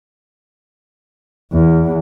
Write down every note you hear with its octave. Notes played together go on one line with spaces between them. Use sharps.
E2